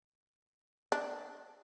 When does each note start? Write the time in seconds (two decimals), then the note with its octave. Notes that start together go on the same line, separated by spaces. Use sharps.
0.92 D4